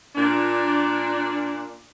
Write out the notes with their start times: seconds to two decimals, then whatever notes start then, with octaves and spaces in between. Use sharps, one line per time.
0.16 A#2 D4